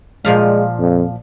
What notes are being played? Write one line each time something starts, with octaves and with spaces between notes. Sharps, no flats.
A#2 F3 G#3 F5
F2